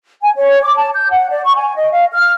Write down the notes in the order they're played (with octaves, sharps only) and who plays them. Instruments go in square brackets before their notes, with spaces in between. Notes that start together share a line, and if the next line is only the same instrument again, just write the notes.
[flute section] G#5
C#5
D6
A5
G6
F#5
D5
C#6
G#5
D#5
F5
F6